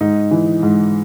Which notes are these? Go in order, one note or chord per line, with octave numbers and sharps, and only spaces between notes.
G#2 D#4
E3
G#2